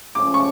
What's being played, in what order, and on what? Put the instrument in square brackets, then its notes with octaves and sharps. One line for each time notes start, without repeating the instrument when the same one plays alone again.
[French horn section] A2 F3 G#3 C#4 [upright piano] D6
[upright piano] C#6